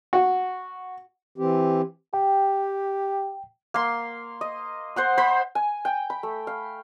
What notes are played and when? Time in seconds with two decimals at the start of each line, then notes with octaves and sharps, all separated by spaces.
0.13 F#4
1.38 E3 C4 G4
2.14 G4 G5
3.74 A#3 C6
4.41 D#5
4.96 C5 F#5 C6
5.18 C5 B5
5.55 G#5
5.85 G5
6.10 B5
6.23 A3
6.47 F5